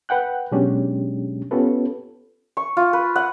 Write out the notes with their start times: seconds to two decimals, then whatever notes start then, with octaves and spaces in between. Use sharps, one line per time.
0.09 B4 F#5 G5 F#6
0.52 B2 F#3 G#3 C#4 D4 G4
1.51 B3 C#4 F4 G4 A4 B4
2.57 C#6
2.77 F4
2.93 B4
3.16 F#5